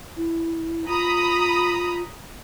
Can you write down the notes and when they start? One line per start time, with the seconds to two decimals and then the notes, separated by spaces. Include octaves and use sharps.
0.17 E4
0.88 F4 A#5 B5 D#6